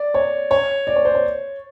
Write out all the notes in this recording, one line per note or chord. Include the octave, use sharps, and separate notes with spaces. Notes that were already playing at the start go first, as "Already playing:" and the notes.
Already playing: D5
C#5
C#5
D5
C#5
C5
C#5